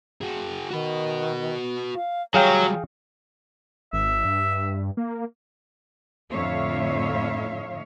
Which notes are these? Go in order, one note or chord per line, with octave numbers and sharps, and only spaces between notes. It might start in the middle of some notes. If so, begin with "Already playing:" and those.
F#4 G#4
D#3 F#4 B4
F5
F#3 G3 F#4 G#4 C#5 F5 G5
G#1 E5
G2
A#3
F2 A2 D3 C#5 E5 F5